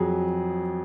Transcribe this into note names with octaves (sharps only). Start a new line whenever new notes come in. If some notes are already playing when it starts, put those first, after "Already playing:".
Already playing: F2 F#3 G#4